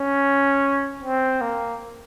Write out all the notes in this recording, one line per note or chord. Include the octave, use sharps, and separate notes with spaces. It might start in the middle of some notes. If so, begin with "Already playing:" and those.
Already playing: C#4
C4
A#3